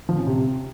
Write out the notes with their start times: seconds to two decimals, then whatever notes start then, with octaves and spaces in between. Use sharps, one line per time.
0.09 F3
0.18 C#4
0.27 C3